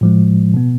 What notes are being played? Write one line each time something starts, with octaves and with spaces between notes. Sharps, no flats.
A2 F3 G#3
B2 B3